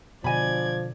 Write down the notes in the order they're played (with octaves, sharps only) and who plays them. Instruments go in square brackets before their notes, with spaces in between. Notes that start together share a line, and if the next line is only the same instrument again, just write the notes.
[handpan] B2 D3 [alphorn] F3 [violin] D5 G#6 [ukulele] D#5 G#5 B5